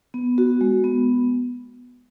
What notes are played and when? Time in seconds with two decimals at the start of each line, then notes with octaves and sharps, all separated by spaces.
0.14 B3
0.38 F#4
0.61 G#3
0.84 B3